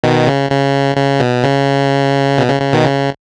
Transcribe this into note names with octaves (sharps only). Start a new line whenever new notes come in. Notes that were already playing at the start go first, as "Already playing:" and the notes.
B2 D#3
C#3
C#3
C#3
B2
C#3
B2
C#3
C#3
B2 D#3
C#3